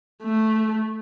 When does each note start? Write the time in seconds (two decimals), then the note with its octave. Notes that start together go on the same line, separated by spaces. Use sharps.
0.23 A3